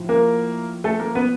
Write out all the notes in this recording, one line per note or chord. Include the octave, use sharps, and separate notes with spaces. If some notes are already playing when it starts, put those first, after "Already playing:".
Already playing: A2 F3
A#3 A#4
A3 A4
A#3 A#4
B3 B4